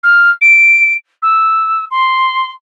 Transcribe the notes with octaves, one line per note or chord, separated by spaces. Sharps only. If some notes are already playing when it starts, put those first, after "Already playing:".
F6
D7
E6
C6